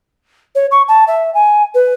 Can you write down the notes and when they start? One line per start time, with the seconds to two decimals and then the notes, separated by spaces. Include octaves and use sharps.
0.55 C#5
0.71 C#6
0.88 A5
1.07 E5
1.34 G#5
1.74 B4